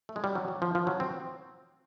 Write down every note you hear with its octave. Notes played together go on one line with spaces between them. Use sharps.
A3
G#3
G3
F#3
F#3
F3
F3
F#3
C4